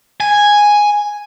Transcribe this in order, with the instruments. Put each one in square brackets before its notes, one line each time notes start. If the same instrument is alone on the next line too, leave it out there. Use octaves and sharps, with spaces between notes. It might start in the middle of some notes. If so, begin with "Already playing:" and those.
[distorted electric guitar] G#5